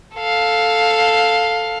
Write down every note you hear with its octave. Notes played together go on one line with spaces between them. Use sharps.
A4 F5